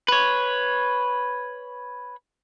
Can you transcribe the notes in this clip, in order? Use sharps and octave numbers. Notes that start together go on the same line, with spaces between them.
B4 C#5